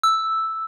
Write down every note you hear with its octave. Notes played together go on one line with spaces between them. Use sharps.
E6